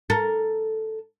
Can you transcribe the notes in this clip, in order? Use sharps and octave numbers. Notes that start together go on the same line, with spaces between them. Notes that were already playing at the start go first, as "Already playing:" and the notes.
A4 A#4